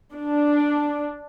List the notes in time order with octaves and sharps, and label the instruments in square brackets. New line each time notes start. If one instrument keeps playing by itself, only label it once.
[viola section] D4